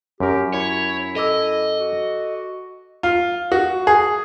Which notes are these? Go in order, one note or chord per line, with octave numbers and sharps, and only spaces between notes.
F#2 G4 A#4
E4 C#5
A4 D#5 D6 E6
F#4
F4
F#4
G#4